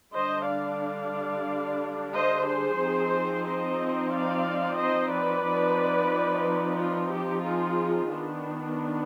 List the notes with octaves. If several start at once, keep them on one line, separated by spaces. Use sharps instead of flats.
D3 G3 D4 C5 D#5
D5 F5
C5 D#5
G#4 C5
F3 C4 D#4
C5 D#5
D5 F5
C5 D#5
B4 D5
F3 C4 D#4
F4
G4
F4 G#4
D#3 B3 D4